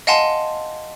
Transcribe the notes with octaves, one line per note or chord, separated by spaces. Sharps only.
D#5 F5 F#5 G#5 A5 C6